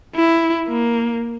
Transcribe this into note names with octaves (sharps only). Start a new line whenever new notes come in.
E4
A#3